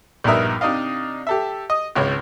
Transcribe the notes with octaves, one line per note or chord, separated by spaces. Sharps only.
A#1 G2 B3 D#4 A#4 E5
C3 D4 D#4 D5 D#5 F5
G4 A4 E5
D#5
G#1 C#2 G#3 C#5